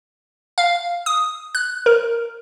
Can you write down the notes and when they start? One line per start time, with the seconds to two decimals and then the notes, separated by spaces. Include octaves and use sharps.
0.58 F5
1.06 D#6
1.55 F#6
1.86 A#4